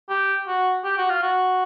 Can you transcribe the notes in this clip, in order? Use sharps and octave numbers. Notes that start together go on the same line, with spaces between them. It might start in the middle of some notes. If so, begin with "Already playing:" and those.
G4
F#4
G4
F#4
F4
F#4